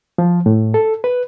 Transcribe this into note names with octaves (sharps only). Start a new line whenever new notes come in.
F3
A2
A4
B4